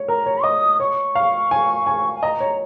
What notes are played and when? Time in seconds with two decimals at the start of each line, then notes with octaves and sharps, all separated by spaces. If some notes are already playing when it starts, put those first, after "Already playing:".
Already playing: C#5
0.08 A#4 A#5
0.26 C#5
0.44 D#5 D#6
0.80 C#5 C#6
1.15 F5
1.51 G#5
1.87 G#5
2.15 G#5
2.23 D#5 A#5
2.40 C#5